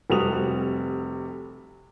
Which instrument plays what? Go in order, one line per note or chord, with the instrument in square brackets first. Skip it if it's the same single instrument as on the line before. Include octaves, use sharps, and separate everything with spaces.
[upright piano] F1 C3 G3 F#4 D#6 F7